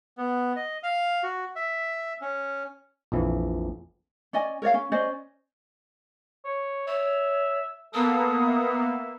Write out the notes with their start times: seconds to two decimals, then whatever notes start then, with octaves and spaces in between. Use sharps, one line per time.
0.18 B3
0.56 D#5
0.83 F5
1.23 F#4
1.56 E5
2.21 C#4
3.12 A#1 F2 E3
4.33 C#4 D5 D#5 G#5
4.62 A#4 C#5 D5 F5
4.74 C#4
4.92 C#4 C5 D5 D#5
6.45 C#5
6.87 C#5 E5
7.94 A#3 B3 A4 D#6
8.47 E5